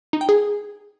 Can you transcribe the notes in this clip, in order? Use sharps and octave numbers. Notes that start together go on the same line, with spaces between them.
D#4
G5
G#4